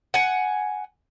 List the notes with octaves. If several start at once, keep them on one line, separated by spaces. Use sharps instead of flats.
F#5 G#5